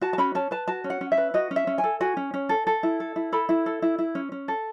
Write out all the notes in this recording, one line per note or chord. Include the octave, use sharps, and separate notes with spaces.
F#4 A5
A5
C#4 B5
C#4 A5
B4 A5
F#4 A5
C#4
F#5
C#4
E5
B4
F#4 D#5
C#4
E5
C#4
G#5
A4
F#4 G#5
C#4
C#4
A4
A4
E4
A4
E4
A4 B5
E4
A4
E4
E4
C#4
C#4
A4